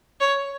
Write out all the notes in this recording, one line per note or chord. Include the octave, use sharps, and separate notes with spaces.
C#5